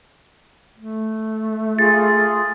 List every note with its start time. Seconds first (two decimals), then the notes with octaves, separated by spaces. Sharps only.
0.77 A3
1.79 F4 G#4 A6